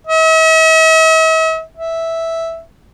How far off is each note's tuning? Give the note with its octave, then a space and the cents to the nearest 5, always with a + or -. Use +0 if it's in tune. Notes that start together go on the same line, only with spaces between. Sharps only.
E5 -45
E5 -5